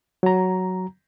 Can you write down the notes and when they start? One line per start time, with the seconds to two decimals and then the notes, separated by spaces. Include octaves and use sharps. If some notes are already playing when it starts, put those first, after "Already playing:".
0.23 F#3 A#5